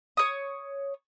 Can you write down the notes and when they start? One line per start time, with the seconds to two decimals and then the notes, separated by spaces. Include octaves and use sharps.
0.17 C#5 D#6